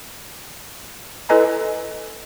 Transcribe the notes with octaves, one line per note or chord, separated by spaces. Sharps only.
E4 A4 B4 D#5 G#5 A#5